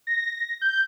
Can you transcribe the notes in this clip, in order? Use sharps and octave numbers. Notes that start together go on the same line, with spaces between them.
A#6
G6